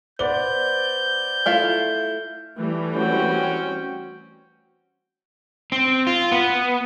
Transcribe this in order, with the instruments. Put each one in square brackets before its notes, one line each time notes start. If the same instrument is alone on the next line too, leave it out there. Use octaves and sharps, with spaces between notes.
[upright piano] B3 D5 G7 [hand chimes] C5 [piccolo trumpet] G6
[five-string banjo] A3 E4 F4 [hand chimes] F6
[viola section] E3 G3 A3
[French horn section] C4 C#4 [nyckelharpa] F#4 G5
[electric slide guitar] C4
F4
B3